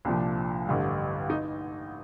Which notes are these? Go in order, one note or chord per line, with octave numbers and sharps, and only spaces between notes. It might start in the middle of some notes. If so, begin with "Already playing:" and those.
C2 A#2 F3 D4
A1 G2 D3 G3
D#4